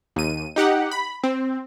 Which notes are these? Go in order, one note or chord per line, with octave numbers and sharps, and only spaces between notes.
D#2 D#7
D#4 G4 F#5
B5
C4